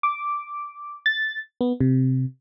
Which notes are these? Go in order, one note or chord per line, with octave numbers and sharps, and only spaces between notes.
D6
A6
B3
C3